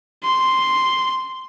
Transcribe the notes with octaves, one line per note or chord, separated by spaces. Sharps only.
C6